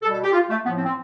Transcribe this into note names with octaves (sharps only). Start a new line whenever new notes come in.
B2 G3 A4
A4
G4
F4
A3
A2 F3 B3
C4
C4